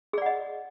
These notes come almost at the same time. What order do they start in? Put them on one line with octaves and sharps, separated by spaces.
G#4 D5 F#5 D#5